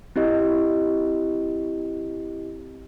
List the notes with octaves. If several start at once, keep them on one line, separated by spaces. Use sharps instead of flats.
C4 E4 G4 D#5